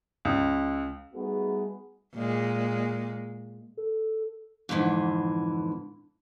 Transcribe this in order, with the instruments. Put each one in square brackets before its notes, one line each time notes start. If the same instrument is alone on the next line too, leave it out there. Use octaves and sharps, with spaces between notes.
[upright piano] C#2
[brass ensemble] G3 A3 B3 D#4 F#4 G#4
[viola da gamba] A#2 G#3
[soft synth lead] A4
[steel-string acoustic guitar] F2 G#2 D3 E3